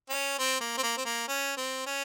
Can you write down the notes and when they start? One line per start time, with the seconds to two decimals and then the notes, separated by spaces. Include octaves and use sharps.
0.09 C#4
0.39 C4
0.61 A#3
0.77 C4
0.83 A#3
0.97 C4
1.05 A#3
1.28 C#4
1.57 C4
1.86 C#4